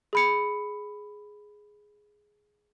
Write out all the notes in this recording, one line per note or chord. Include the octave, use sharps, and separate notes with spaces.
G#4 B5 C#7